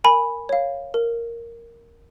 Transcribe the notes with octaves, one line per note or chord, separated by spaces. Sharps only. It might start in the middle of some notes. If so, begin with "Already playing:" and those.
A#4 G#5 B5
C#5 F5
A#4